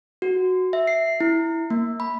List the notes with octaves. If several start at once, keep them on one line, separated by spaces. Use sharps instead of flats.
F#4
E5
C7
E4
A#3
B5